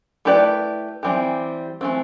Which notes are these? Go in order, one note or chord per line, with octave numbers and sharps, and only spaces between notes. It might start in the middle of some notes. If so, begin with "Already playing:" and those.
A3 E4 G4 B4 D5
E3 G3 C4 G4
E3 A3 C4